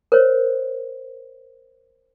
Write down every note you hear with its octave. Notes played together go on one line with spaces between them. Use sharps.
A#4 C5 C#5